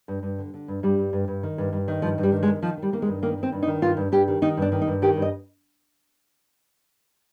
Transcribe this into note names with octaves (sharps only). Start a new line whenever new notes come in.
G2
G2
D3
D3
G2
G2 G3
G2
G2
G2
D#3
G2
G2
D#3
G2 F3
G2
G3
D#3
G#3
D#3
D#3 F3
D#3
G3
D#3 A#3
G#3
G2
D#3 A#3
D#3
C4
G2
D#4
D#3
G2 F4
G2
G2 G4
D#3
D#3 D#4
G2 D4
D#3
D#4
G2
D#3 G4
G2
D#5